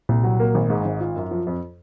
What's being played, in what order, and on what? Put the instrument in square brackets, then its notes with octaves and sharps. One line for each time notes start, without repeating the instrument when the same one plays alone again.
[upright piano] C2 [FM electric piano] A#2
[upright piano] F#3
A#3
G#1
G#2
G#1
F4
F#2
F3
F2